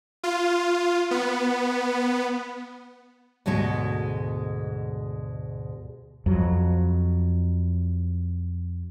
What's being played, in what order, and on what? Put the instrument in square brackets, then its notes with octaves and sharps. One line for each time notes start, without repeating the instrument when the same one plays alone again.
[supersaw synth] F4
B3
[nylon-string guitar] D2 G#2 B2 G#3 C#5
[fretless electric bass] F2 F#3